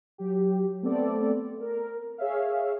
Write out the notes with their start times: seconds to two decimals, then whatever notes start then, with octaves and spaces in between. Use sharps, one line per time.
0.18 F#3 G4
0.82 A3 B3 C4 A4 D5
1.61 A#4
2.18 G#4 C#5 E5 F5